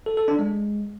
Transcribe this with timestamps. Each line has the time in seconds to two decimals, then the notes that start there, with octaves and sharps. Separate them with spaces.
0.06 A4
0.17 A4
0.28 D4
0.39 G#3